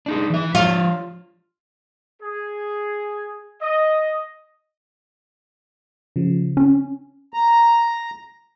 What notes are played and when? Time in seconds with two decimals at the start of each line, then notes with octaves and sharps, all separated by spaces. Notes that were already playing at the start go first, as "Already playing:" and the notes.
0.06 D4 D#4 G#4
0.30 E3 E5
0.55 F3 F4 C#5 F5
2.21 G#4
3.61 D#5
6.16 C#3 F3
6.57 C#4
7.34 A#5